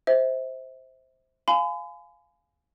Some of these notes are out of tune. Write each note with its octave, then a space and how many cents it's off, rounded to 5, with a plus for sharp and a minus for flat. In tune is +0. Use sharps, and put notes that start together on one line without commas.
C5 +0 E5 -35
F5 -5 G#5 +15 B5 +45